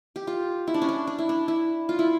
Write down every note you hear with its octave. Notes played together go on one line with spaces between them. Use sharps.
G4
F4
E4
D4
C#4
D4
D4
E4
D4
E4
F4
E4